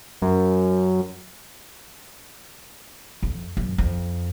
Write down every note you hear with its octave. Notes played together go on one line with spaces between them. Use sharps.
F#2
F2
F#2
F2